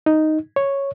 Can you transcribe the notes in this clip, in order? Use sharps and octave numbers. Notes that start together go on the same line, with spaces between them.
D#4
C#5